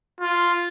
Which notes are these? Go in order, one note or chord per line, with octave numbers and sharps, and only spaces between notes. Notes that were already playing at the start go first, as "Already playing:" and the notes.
F4